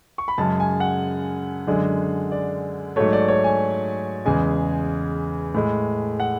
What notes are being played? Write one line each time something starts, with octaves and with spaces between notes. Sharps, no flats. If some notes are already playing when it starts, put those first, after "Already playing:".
C#6
B5
F#2 C#3 G#3 A5
G#5
F#5
F#2 D3 G#3
D5
G#2 F#3 A3 C#5
D5
C#5
G#5
E2 C#3 G#3 G#5
A2 G#3
F#5